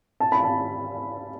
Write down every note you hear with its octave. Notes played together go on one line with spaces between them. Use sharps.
A5
B5
A5